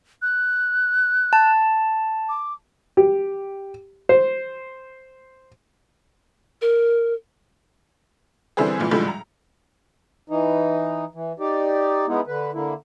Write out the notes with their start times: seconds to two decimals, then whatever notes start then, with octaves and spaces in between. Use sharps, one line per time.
0.22 F#6
1.33 A5
2.29 D6
2.97 G4
4.09 C5
6.61 A#4
8.57 D3 E3 G3 C4 G#4
8.79 C#2 A#2 E3
8.91 C#2 A2 D3 F3 G3 G#3
9.08 A#5
10.30 E3 D#4
11.15 E3
11.40 D#4 G4 D5
12.07 G#3 B3 D#4 E4
12.27 D3 B4
12.54 D3 A#3 E4